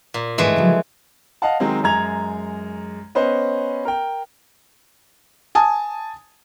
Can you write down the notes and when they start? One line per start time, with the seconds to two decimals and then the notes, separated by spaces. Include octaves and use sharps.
0.14 A#2
0.38 D#2 G#2 E3 G#3 A3 B4
0.56 C#3 F3 F#3
1.42 D#5 F5 F#5 A5
1.60 D#3 F#3 G#3 C4
1.84 F#2 G#3 A#5 G#6 F7
3.15 B3 C#4 B4 C5 D#5
3.85 A#4 G5
5.55 G#5 A5 D#6